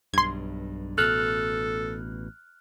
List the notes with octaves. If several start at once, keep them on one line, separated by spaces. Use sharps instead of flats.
B1 G2 C6 G#6
A1 B2 A4 F6 F#6